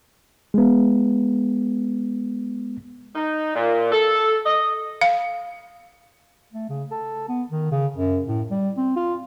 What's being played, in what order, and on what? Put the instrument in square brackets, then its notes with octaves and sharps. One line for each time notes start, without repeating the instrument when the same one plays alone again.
[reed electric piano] G#3 B3
[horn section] D#4
A#2
A4
D#5
[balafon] F5
[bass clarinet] A3
C#3
A4
B3
D#3
C#3
F#2
A2
G3
C4
F4